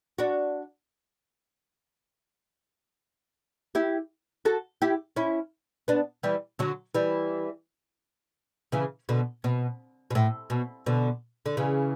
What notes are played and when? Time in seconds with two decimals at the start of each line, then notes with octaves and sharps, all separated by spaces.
0.18 D4 F#4
3.75 E4 G4
4.45 F#4 A4
4.82 E4 G4
5.16 C#4 E4
5.88 B3 D4
6.23 E3 G3
6.59 D3 F#3
6.94 E3 G3
8.72 C#3 E3
9.09 B2 D3
9.44 B2
10.10 B2
10.15 A2
10.50 B2
10.86 B2 D3
11.46 D3
11.57 C#3 E3